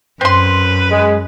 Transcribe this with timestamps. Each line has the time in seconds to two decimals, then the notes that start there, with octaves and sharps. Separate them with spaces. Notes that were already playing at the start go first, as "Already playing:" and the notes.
0.21 F#2 C4 B4 C6
0.91 G#3